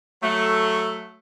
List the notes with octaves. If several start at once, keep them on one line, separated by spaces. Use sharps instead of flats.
F#3 A3